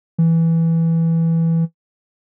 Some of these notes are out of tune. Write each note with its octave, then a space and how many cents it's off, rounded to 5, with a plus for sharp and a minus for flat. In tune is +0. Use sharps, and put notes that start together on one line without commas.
E3 +0